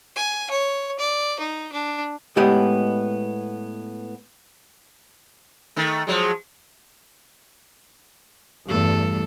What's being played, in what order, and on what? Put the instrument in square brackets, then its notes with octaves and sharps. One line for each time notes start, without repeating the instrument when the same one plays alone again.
[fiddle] G#5
C#5
D5
D#4
D4
[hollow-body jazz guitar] A2 G#3 B3 G4 D#5 F#5
[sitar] D#3 A3
F3 F#3 G#3
[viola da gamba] E2 A3 A4 [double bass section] G2